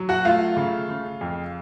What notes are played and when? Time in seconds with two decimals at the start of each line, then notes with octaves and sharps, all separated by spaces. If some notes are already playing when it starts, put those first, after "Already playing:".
Already playing: F#3
0.09 F#4 F#5
0.25 A3 F4 F5
0.57 C#3
0.89 C#3
1.21 F2